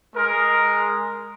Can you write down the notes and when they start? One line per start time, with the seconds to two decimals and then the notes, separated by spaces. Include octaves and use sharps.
0.16 G#3 A#4